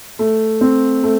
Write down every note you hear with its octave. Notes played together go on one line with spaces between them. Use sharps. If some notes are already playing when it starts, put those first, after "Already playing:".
A3
C4
A3